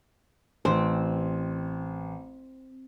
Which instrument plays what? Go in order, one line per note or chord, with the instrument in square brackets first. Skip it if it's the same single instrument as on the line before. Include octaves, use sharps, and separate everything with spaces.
[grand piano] A1 [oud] C4